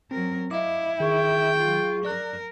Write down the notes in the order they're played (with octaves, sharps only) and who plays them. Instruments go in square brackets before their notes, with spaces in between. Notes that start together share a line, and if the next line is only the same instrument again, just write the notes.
[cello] F#3 A#4 [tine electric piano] C4
[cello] E4 [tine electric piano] D#5 F5 D6
[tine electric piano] D#3 [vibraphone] G#4 C#6 [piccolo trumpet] G5
[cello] F#3 F4
[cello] A#4 [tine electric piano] D5 F#6